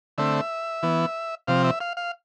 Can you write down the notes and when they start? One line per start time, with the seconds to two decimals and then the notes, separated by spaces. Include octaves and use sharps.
0.18 D3 A3 C4 E5
0.83 E3 B3
1.47 C3 F3 C4 F5
1.64 E5
1.80 F5
1.97 F5